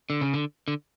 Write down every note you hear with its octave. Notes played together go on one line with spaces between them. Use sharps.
D3
C#3
D3
D3